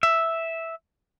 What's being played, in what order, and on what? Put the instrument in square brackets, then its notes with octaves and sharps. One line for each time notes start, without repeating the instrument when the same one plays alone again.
[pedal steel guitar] E5